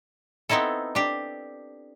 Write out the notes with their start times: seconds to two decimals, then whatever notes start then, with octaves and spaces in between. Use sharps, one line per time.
0.49 B3 C4 D#4 E4 A4
0.95 D4 G4